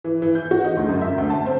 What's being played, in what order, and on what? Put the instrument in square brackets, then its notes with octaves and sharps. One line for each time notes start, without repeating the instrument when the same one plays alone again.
[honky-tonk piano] E3
E3
G6
F#4
D#4
D2
F#2
E5
D2
A5
C4